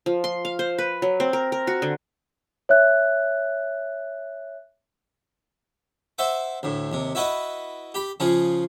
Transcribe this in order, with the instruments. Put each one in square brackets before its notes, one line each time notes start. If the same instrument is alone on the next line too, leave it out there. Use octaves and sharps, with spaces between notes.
[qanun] F3
C6
F5
C5
B4
F#3
C4
A#4
A#4
F#4
D3
[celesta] C#5 E5 F#6
[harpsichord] C5 E5 F#5 D6
D2 A2
D#2 C3
E4 F#4 B4 D#5 F#5
G4 B5
C#3 F3 F4 G#4